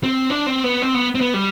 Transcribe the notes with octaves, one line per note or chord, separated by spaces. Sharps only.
C4
D4
C4
B3
C4
B3
C4
B3
G3